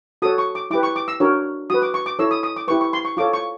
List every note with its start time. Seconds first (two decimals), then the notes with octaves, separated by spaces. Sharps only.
0.22 F#4 A4 C#5 D#6
0.38 C#6
0.55 D6
0.70 E4 G4 B4 D6
0.83 C#6
0.96 D6
1.08 E6
1.20 D4 F#4 A#4 C#5
1.70 F#4 B4 D#6
1.82 D6
1.94 C#6
2.06 D6
2.19 E4 A4 C#5 E6
2.31 D#6
2.43 D#6
2.56 D6
2.68 E4 G4 B4 C#6
2.81 C#6
2.93 C6
3.05 C#6
3.17 F4 A4 C#5 D6
3.33 C#6